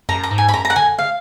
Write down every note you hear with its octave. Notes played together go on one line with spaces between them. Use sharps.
F#2 A#5
A#5
G#2
G#5
B5
F#2 A#5
A#5
F#5
D3 G#5
F5